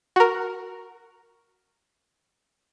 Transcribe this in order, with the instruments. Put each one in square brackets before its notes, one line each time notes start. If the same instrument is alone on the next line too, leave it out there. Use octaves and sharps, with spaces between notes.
[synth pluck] F#4 A#4